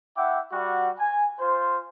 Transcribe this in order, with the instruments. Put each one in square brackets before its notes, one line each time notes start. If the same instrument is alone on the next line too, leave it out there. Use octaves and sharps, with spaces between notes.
[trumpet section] E4 E5 F#5 G5 D6
G3 F#4
G#5
F4 C5